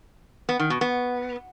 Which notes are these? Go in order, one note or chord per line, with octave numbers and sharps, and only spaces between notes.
B3
D#3
B2
B3